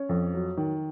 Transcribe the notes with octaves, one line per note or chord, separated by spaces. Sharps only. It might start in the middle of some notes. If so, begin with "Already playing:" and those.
Already playing: C#4
F2
F#3
D#3